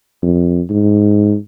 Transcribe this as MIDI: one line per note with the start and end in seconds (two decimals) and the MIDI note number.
0.23 0.61 41
0.70 1.35 44